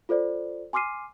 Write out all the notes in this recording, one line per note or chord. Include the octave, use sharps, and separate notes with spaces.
F4 A4 C5 D5
G#5 C6 D6 F6 C7 D#7